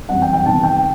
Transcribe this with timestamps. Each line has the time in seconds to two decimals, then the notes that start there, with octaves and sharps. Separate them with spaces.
0.09 F#2 E3 G3 C4 F#5
0.22 G5
0.33 G5
0.45 C3 D#3 G3 B3 A5
0.63 G5